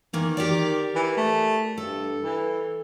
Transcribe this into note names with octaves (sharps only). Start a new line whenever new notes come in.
D#3 E3 A#3
G4 A#4 D5
E3
A3
G2 A4
E3